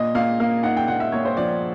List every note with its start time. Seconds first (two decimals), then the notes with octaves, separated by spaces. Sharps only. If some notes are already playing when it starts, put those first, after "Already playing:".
Already playing: A#2 D#5
0.15 A#2 F5
0.40 A#3 F5
0.63 D#4 F#5
0.77 G5
0.88 A#2 F#5
1.00 E5
1.12 A#2 C#5
1.25 C5
1.37 F3 D5